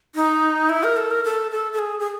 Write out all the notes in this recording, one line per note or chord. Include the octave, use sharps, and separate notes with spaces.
D#4
E4
A#4
A4
A#4
A4
A4
A4
G#4
G#4